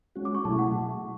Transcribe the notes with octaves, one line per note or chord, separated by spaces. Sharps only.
G#3 C#4 F#4
D6
C#6
B2 F#3 A3 E4 G#4 A5
F#5